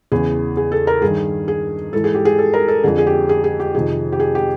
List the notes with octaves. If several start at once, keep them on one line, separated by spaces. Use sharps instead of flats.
E2 C#3 E3 G#4
G#4
A4
A#4
G2 D#3 G#4
G#4
G#2 E3 A4
G#4
G4
G#4
A4
A#4
A4
F2 D3 G#4
G#4
G4
G#4
G#4
G4
F2 C3 D#3 G#4
G4
G#4
G4